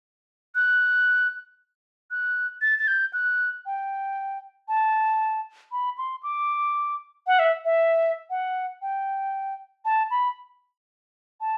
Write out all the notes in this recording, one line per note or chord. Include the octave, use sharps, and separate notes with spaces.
F#6
F#6
A6
A6
G6
F#6
G5
A5
B5
C6
D6
F#5
E5
E5
F#5
G5
A5
B5
A5